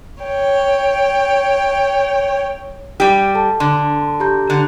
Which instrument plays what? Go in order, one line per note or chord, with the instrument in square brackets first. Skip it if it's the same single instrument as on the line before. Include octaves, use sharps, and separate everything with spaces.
[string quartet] C#5 G5
[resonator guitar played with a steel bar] G3 G4
[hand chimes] A4 A5
[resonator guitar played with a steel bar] D3 [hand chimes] C6
[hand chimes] G4 A#5 G6
[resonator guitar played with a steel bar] D3